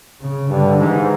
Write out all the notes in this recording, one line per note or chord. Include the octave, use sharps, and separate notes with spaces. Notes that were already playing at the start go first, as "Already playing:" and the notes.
C#3
G2 D3
G#2 E3